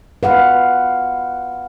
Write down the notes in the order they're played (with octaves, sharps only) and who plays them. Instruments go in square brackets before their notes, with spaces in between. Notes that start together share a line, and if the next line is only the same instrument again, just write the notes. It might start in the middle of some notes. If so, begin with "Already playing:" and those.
[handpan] B4 F5 F#5